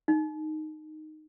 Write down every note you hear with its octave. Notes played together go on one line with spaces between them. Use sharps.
D#4